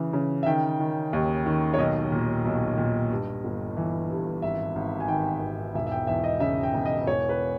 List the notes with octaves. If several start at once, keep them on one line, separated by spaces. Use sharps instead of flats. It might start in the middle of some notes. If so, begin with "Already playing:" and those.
Already playing: C#3 E3
C#3
E5
D#3 G5
D#3
D#2
D#3
C#5
B1 D#5
A#2
B1
A#2
G2
G1
E3
G2
G#1 E5
G#1
G#5
D#3 G5
G#1
E1 E5
E5
G5
E2 E5
D#5
C#3 E5
G5
E1
D#5
E1 C#5
B4